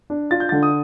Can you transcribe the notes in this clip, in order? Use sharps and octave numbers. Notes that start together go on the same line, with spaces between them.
D4
F4 A6
G6
D3 A6
D#6